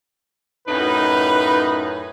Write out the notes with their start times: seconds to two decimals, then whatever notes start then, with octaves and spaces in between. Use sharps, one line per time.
0.67 F#2 A2 D#4 B4